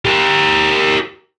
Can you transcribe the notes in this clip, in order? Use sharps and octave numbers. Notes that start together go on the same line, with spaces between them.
G4 A#4